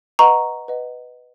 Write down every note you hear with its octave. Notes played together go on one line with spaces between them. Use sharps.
B4 D#5 F#5 A#5 C#6
B4 D#5 F#5